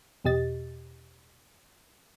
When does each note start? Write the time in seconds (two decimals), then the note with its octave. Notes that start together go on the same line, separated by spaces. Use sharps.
0.24 E2 B2 G4 D#5 A6